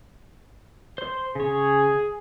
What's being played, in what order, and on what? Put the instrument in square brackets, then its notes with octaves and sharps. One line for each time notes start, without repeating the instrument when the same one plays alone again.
[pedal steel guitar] C5 C6
[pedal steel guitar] C#3 C#5 [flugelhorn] G#4